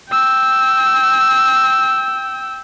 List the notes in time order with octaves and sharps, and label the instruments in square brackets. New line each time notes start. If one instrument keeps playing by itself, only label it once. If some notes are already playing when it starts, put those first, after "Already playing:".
[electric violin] G5 E6